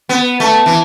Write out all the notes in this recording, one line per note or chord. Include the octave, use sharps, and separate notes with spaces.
B3
A3
E3